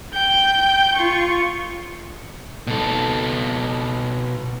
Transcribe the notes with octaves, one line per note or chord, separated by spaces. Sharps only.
G5 G6
F4 C#6
B2 A4